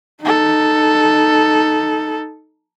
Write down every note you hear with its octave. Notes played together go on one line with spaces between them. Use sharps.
D#4 A4